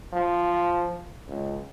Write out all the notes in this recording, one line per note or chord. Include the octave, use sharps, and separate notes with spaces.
F3
C#2